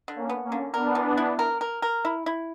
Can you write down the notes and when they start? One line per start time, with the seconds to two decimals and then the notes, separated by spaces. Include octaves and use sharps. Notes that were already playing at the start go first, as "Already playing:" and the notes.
0.08 D3
0.16 A#3 C#4
0.29 B3
0.44 A#3 C#4
0.52 D3
0.74 B3 D4 A#4
0.95 E3
1.17 E4
1.39 A#4
1.61 A#4
1.82 A#4
2.05 E4
2.26 E4